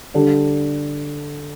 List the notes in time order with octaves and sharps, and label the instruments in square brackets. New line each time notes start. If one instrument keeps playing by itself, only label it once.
[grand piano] D3 G3 D4 A4